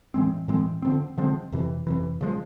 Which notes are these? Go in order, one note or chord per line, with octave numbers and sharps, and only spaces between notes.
A2 E3 G#3 C4
A2 E3 G#3 C4
D3 F3 G#3 C4
D3 F3 G#3 C4
F2 C3 E3
F2 C3 E3
C#3 F3 G#3